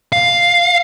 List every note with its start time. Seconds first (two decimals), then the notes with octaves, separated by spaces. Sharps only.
0.12 F5